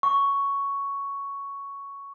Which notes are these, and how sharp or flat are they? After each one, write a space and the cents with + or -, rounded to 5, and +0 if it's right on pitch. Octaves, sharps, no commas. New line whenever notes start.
C#6 +5